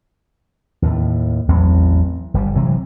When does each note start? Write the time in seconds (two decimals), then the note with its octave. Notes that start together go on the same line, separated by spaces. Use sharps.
0.82 D#2 A2
1.48 A1 E2 F#3 C4
2.34 G1 G3
2.55 C3 E3 F#3 G#3